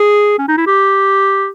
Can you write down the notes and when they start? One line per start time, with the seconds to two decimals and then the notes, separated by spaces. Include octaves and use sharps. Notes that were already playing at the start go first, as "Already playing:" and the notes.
Already playing: G#4
0.38 C#4
0.48 D#4
0.58 E4
0.67 G4